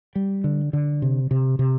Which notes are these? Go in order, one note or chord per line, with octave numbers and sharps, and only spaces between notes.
G3
D3
D3
C3
C3
C3